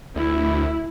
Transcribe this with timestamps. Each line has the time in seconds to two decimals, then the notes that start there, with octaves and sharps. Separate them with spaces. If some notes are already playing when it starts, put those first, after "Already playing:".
0.16 D2 E4